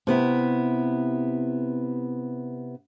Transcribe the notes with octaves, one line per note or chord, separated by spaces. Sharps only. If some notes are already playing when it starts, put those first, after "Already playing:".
C3 B3 E4